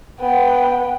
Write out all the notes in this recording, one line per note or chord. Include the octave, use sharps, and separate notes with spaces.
B3 G5